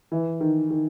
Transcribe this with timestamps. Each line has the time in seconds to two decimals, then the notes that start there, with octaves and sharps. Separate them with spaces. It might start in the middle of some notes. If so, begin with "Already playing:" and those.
0.12 E3
0.41 D#3
0.70 D#3